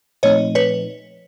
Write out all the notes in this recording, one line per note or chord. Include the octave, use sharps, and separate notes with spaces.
A#2 F3 A3 C4 D#4 C#5 D#5
B4 C#5